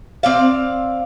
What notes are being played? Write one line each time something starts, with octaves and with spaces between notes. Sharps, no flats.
C4 D5 F5